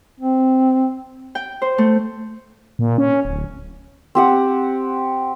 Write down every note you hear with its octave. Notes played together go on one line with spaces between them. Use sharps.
C4
G5
C5
A3
A#2
C#4
D1
C4 G4 F#5